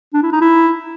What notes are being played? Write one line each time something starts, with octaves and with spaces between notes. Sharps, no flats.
D4
E4
D#4
E4